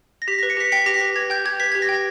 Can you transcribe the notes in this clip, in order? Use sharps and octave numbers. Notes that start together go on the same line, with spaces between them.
A#6
G4 B6
B4 A#6
C#7
G4 B6
G5 B6
G4 A#6
B6
B4
G4 G#6
G5 G6
G4 G#6
B4 B6
G4 G#6
A#6
G5